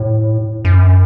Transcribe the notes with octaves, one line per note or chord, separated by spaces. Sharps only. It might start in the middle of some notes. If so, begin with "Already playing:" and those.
Already playing: A2
F#2